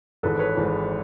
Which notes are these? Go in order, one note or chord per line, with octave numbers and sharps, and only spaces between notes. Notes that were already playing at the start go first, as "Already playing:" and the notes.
G#1 G#2 E3 A4 B4
B4 C#5
G#1 G#2 E3